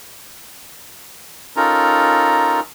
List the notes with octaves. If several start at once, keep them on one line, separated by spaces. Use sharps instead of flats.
C#4 D#4 F4 A4 A#4 A#5